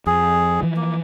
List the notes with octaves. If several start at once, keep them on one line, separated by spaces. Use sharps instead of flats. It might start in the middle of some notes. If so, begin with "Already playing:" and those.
F2 G#4
E3 F3
A#3